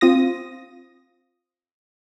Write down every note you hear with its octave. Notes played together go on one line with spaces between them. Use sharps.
C4 F4 D#6 A#6